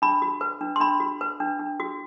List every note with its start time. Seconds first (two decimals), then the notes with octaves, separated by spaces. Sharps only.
0.02 D4 B5
0.22 F#4
0.41 B4
0.61 D4
0.76 C6
0.80 D4 B5
1.00 F#4
1.21 B4
1.40 D4
1.59 D4
1.80 F#4